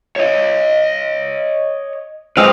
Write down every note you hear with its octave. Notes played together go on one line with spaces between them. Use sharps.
C#5 D#5
F#3 G#3 C4 B4 F5